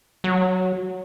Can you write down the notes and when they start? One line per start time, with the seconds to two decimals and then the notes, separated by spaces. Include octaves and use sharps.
0.24 F#3